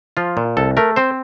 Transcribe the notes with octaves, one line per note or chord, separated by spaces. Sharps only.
F3 F4
A#2
C2 A4
A3 A#4
C4 C5